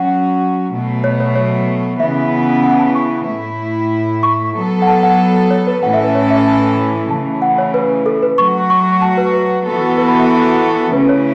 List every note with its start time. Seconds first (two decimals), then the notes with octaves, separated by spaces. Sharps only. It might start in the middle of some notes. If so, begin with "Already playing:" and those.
Already playing: F#3 C#4 F#4 F#5
0.72 B2 F#3 A3
1.04 C#5
1.20 C#5
1.36 C#5
1.99 C#3 E3 B3 E5
2.64 F#5
2.79 A5
2.95 C#6
3.27 A2 A3 E4
4.23 C#6
4.55 F#3 B3 A4
4.82 F#5
4.87 A5
5.03 F#5
5.51 C#5
5.67 B4
5.83 A2 E3 C#4 A4 F#5
5.94 E5
6.04 B4
6.15 C#5
6.30 E5
6.47 A5
7.10 C#3 E3 A3 A5
7.42 F#5
7.58 C#5
7.74 B4
8.06 A4
8.23 B4
8.37 F#3 A3 F#4 C#6
8.70 C#6
8.80 C#6
9.02 A5
9.17 B4
9.34 B4
9.66 E3 B3 F#4 A4
9.98 B4
10.08 B5
10.19 E5
10.93 C#3 E3 A3 C#4 E4 B4
11.09 C#5